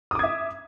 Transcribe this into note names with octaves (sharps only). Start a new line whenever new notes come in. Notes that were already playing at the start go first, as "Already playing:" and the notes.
E5 D6 D#6 G#6